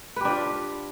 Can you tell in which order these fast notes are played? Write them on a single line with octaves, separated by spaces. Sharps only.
B4 G4 D4 F4